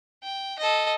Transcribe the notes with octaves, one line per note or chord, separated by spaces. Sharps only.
G5
A4 D#5